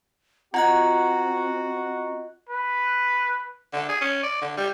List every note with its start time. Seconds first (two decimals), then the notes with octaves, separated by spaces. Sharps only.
0.54 C4 F4 F#4 D#5 F#5 A#5 F#6
2.49 B4
3.73 D3
3.88 G#4
4.01 C#4
4.23 D5
4.41 D3
4.57 G3